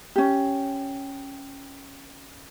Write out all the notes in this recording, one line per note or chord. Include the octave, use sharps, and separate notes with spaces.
C#4 G4